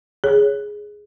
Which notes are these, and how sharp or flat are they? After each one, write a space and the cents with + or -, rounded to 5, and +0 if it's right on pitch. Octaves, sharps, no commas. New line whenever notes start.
G#4 +0 C#5 +0